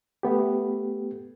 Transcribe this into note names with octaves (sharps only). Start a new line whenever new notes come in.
A3 B3 G4